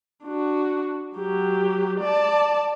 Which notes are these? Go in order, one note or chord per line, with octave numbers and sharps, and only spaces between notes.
D4 F#4
F#3 G4
D5 A5